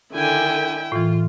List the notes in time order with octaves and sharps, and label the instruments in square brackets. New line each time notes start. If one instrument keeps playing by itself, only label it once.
[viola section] D3 D#3 G#5 [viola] E4 G5
[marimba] A2 E3 [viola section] F4